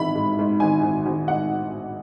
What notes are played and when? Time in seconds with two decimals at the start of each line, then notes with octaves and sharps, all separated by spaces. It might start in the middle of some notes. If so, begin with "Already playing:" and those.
Already playing: G#1 E3 B5
0.16 G#2
0.39 G#2
0.60 G#1 G#5
0.83 G#1
1.06 G#1
1.28 G#2 F#5